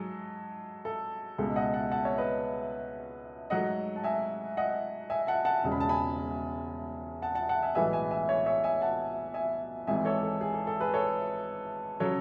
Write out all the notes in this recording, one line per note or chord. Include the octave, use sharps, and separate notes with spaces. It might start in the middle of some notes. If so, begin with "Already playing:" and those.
Already playing: G#2 F#3 G#4 A4
A4
C#2 B2 G#3 A4
D#5 F#5
F#5 A5
F#5 A5
C#5 E5
B4 D#5
G#2 F#3 A3 D#5 F#5
A5
E5 G#5
D#5 F#5
E5 G#5
F#5 A5
F#5 A5
E1 E2 C#3 G#3
B5
A5
G#5 B5
F#5 A5
F#5 A5
F#5 A5
E5 G#5
B1 A2 E3 G#3 B3 E5 G#5
E5 G#5
E5 G#5
C#5 E5
C#5 E5
E5 G#5
F#5 A5
E5 G#5
G#1 G#2 E3 E5 G#5
A4 C#5
A4
G#4
A4
A4
G#4 B4
A4 C#5
C#3 F#3 A4 C#5